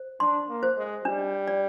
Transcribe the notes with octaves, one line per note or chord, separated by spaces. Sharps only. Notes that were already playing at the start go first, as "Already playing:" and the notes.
Already playing: C5
D4 C6
A#3
C5
G#3
G3 D4
D5